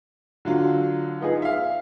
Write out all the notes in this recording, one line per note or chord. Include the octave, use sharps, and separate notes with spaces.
D3 F#3 F4
B3 D#4 F4 G#4
E5 F5